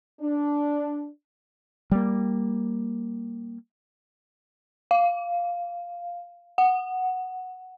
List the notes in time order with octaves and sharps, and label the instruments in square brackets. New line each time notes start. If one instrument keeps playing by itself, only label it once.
[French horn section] D4
[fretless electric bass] G3 A#3
[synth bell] F5
F#5